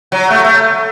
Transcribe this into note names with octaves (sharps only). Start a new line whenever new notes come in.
F#3
A3
A3